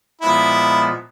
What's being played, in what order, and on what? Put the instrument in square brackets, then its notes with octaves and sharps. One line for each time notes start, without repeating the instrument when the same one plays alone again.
[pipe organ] A#2 F3 G#3 B3 [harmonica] E4